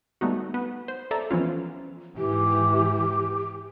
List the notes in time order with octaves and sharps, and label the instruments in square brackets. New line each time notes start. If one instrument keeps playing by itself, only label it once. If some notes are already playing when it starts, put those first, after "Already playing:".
[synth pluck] G3 A3 B3 D#4 F#4
B3
C5
A4 D5 E5 A#5
E3 F3 B3 C#4 F4
[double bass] G#2 E3 [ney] G4